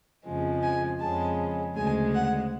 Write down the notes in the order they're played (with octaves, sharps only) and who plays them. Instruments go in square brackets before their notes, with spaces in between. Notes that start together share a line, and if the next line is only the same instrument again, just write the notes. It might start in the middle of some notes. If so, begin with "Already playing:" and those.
[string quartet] F2 C#3 F3 G#3
G#5
F2 C#3 G#3 A5
D2 C#3 G#3 G#5
F#5